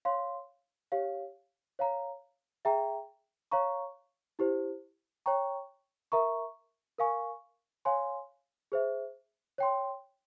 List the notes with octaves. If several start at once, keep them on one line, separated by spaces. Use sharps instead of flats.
C#5 F5 C6
G4 C#5 F5
C#5 F5 A#5
G#4 E5 G5 A#5
C#5 F5 A#5 C#6
E4 G4 C5
C#5 G5 A#5 C#6
A#4 E5 A#5 C#6
A#4 F5 G#5 C#6
C#5 F5 G#5 C6
G#4 C5 E5
C#5 G5 C6